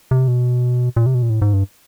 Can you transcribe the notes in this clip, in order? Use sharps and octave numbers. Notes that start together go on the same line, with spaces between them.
C3
B2
A#2
C3
B2
A#2
A2
G#2
G2